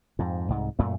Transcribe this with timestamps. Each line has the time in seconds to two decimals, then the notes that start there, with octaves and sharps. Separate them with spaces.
0.19 F2 G#2
0.49 C2 G#2
0.79 F#2 A#2 A3